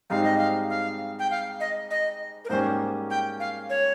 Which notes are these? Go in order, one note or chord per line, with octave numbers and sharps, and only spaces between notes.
G#2 G3 C4 D#4 F5
D#5
F5
F5
G5
F5
D#5
D#5
A#4
G#2 G3 A#3 C#4 C5
G5
F5
C#5